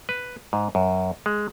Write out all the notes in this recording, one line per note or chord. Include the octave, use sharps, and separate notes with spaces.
B4
G#2
F#2
G#3